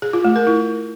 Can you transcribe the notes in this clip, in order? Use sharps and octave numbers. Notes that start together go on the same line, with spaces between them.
G#4
F4
A3
A#4
E4